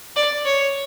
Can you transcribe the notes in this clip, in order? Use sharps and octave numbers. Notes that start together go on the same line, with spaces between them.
D5
C#5